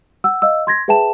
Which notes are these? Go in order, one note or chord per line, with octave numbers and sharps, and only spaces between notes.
F#5 E6
D#5 F5 E6
C6 G#6 A#6
G#4 B4 E5 G5 A5 E7